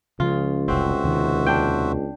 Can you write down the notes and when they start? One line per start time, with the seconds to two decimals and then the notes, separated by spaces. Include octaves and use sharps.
0.20 C#2 C#3 F3 F4
0.68 F1 C2 C4 F#4 C5 E5
1.04 D#2 C3 D#3
1.46 D4 G5